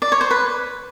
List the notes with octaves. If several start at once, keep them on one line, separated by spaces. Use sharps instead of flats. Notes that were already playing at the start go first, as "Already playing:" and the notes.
D5
C#5
C5
B4